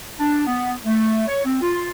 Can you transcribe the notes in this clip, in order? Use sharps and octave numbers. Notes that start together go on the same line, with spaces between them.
D4
B3
A3
C#5
C4
F4